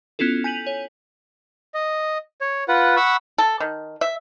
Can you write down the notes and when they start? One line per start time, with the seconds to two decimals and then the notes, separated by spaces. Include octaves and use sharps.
0.19 B3 C#4 E4 F4 A4
0.44 G#5 G6 B6 D#7 F7 F#7
0.67 C#5
1.74 D#5
2.41 C#5
2.68 F4 B4 F#5
2.97 F#5 B5 C#6 E6
3.38 A4
3.60 D#3
4.01 E5